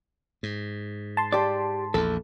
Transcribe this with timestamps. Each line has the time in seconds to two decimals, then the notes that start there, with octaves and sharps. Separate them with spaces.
0.43 G#2
1.17 A5 C6
1.32 G4 D5
1.94 A#1 E2 A4